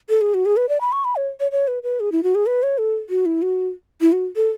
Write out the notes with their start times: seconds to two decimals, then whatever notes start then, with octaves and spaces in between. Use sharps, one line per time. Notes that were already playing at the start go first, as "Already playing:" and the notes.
0.09 A4
0.21 G#4
0.34 F#4
0.46 G#4
0.57 B4
0.69 D5
0.81 B5
0.92 C#6
1.05 B5
1.16 C#5
1.40 C#5
1.52 C#5
1.68 B4
1.83 B4
2.00 G#4
2.12 E4
2.23 F#4
2.35 G#4
2.46 B4
2.63 C#5
2.78 A4
3.10 F#4
3.26 E4
3.42 F#4
4.01 E4
4.12 F#4
4.36 A4